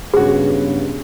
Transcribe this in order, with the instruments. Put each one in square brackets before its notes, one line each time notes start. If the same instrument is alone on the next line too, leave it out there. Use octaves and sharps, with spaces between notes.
[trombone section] G2 C#3 B3 [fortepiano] G#3 F#4 [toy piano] G#4